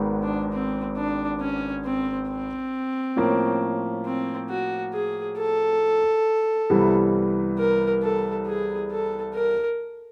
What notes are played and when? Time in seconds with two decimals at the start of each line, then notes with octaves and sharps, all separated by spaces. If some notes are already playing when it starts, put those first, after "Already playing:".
Already playing: G#1 G#2 D#3 G#3 B3
0.23 D4
0.52 C4
0.97 D4
1.41 C#4
1.85 C4
2.29 C4
3.16 A2 F3 A#3 C#4
4.05 C4
4.49 F#4
4.94 G#4
5.38 A4
6.70 C2 C3 E3 G3 B3
7.58 A#4
8.02 A4
8.47 G#4
8.91 A4
9.35 A#4